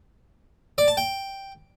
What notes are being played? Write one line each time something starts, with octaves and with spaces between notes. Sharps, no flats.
D5
A5
G5